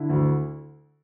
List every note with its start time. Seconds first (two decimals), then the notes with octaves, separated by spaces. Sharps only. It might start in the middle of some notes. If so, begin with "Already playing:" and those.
Already playing: D3 E4
0.09 D2